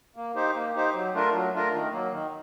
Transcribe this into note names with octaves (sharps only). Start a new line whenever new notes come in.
A#3
D#4 G4 C5
A#3
D#4 G4 C5
F#3
A3 D4 F4 A#4
F#3
A3 D4 F4 A#4
D#3
F#3 A#3
D#3